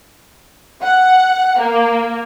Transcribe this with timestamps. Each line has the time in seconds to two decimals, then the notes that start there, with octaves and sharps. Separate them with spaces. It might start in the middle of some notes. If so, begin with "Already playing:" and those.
0.82 F#5
1.59 A#3